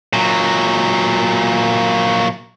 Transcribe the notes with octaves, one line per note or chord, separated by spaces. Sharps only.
A#2 F#3